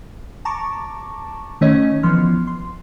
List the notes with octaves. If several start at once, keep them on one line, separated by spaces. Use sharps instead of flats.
A5 A#5 C#6 D6
D#3 A3 C#4 C#5 D#5
E3 F3 B3 C6 F6
C6